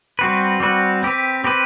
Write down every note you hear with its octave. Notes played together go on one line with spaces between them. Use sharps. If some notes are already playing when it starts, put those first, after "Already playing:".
G3 C4 F#4 B4
G3 C4 F#4 B4
C4 G4 B4
C4 G4 B4